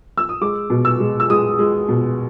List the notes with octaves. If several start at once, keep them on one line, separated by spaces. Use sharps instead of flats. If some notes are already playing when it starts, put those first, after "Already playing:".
E6
D#6
G#3 D6
B2
E6
G#3
E6
G#3 D#6
G#3
B2